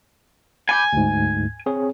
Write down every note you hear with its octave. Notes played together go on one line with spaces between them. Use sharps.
G#5 B5 D6 G6
D2 G#2
C4 G#4 C#5